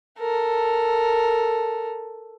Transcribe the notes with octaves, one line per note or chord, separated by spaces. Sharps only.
A4 A#4